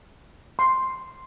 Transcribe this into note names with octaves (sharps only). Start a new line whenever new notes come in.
C6